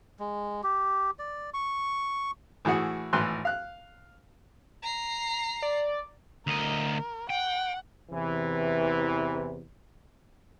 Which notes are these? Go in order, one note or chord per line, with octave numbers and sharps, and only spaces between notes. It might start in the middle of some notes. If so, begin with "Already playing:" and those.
G#3
G4
D5
C#6
A2 E3 F#4 G#4 F#5
G#1 A2 E3 B4 C6 F#6
F5 F#6
A#5 C7
D5
D2 A#4 D#5
F#5 G5
E2 C3 E3